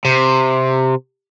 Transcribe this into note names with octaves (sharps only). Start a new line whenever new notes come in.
C3